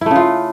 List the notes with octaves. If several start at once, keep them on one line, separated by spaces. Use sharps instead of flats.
C#3 A3 E4 F4